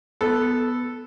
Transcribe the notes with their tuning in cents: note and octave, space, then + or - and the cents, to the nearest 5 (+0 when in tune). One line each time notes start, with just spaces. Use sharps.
B3 +0 A4 +0